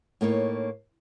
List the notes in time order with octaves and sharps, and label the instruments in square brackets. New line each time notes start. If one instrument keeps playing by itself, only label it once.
[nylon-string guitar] A2 A#3 D#4 C#5